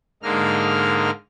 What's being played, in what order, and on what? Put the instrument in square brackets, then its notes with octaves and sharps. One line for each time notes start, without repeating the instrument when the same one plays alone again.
[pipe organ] G#2 D3 G#3 A#3 D#4 F6